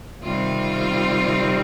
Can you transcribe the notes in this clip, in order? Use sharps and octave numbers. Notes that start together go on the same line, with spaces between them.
C3 D#3 G3 C4 F4